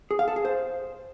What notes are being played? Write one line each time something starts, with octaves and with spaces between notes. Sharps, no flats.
G#4
F5
A4
G#4
C5